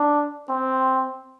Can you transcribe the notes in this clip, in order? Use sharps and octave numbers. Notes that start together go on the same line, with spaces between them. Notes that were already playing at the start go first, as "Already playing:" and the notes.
Already playing: D4
C4